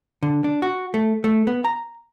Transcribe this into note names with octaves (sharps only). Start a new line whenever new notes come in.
D3
D4
F#4
A3
A3
B3
A#5